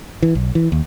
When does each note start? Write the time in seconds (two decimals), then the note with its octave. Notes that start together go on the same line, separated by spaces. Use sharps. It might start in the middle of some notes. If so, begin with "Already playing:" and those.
0.23 E3
0.35 B1
0.55 E3
0.72 D#2